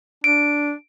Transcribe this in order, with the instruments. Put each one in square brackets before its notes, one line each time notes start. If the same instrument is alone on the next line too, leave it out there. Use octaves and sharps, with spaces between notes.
[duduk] D4 [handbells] D7